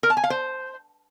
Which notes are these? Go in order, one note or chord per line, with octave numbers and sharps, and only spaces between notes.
A#4
A5
G#5
F5
C5